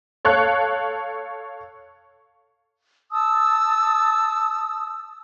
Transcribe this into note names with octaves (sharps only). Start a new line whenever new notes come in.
A4 C#5 F5 F#6
A5 D#6 E6